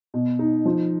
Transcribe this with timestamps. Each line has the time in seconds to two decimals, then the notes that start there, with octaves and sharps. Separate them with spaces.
0.14 B2
0.39 D#4
0.65 F3